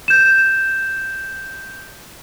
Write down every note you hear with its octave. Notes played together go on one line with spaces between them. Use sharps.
G6 E7